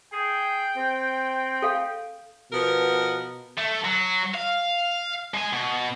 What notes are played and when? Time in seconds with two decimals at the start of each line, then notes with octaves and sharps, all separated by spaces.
0.13 G#4 G5
0.77 C4
1.62 A4 F5
2.52 B2 F3 B3 A#4
3.58 A3
3.85 F#3
4.34 F5
5.34 G#3 G#5
5.53 B2